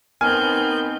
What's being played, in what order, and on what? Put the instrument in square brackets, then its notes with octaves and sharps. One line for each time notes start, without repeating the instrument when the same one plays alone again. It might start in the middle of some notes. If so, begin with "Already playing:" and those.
[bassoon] D#3 [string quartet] B3 C4 G6 [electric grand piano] G#5 [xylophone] F6